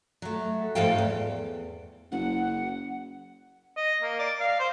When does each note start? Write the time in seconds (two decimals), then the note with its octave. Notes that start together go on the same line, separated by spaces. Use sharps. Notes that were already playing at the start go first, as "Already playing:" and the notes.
0.22 F#3 A3
0.75 G#2 F3 A3 A4 F5 G5
0.98 E2
2.12 F#1 F#5
3.77 D#5
4.02 A#3
4.19 D5
4.40 F5
4.60 C5